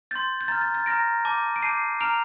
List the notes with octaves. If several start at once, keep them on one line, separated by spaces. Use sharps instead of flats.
C6 G6 A6
G6
A#5 F6 A6
A6
A6
A#5 F6 A#6 D7
A5 D6 G6
D7
A5 D6 G6 C7 D#7
A#5 F6 D7 F7